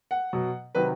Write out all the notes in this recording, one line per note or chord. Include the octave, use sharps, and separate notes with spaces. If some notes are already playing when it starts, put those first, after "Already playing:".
F#5
B2 F#3
C3 D#3 F#3 B4